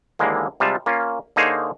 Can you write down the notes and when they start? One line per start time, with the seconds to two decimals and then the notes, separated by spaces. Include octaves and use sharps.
0.19 D#2 D3 E3 G#3 A#3
0.60 C3 G3 G#3 F4 A5
0.86 A#3 C#4 F4
1.36 D3 A#3 D#4 G#4 C5 C#5